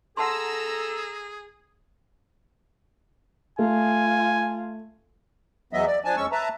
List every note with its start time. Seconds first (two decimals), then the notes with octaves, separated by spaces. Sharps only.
0.17 G#4 A4 F#5 A5 A#5 C6 E6
3.59 A3 F4 G#5
5.73 E2 E3 F#3 B3 D#5 E5
5.86 D5
6.05 F3 D4 G#5 A5
6.17 E2 G#3 C#4 C#6 E6
6.32 B4 E5 A5 A#5